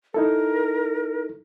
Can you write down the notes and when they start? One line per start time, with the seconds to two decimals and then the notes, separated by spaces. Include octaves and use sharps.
0.14 D#4 E4 A4 A#4